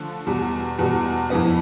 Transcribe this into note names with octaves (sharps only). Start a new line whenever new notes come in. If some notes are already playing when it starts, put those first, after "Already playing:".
Already playing: D3 F3 A3
E2 B2 G3
E2 B2 G3
F2 E3 B3